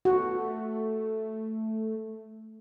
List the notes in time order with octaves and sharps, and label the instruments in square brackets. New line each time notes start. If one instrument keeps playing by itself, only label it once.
[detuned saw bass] A3 [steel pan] F#4